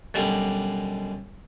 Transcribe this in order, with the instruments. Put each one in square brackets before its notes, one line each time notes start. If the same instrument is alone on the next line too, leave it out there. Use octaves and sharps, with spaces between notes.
[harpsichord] F#2 B2 D3 G3